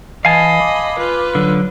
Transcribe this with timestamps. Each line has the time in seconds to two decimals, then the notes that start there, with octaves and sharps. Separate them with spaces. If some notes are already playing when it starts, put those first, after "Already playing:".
0.25 E3 D#5 F5 G#5 A5 B5
0.60 D6
0.99 F4 B4
1.35 D3 F#3